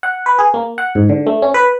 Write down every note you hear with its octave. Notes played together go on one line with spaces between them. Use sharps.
F#5
B4
G#4
A#3
F#5
G#2
D3
A3
C#4
B4